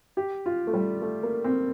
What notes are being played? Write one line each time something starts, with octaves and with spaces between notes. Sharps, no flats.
G4
F4
A3
G3
A3
A#3
C4